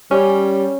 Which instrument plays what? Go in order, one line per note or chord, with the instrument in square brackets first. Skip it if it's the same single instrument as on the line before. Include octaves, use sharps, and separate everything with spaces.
[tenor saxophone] G3 [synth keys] C#4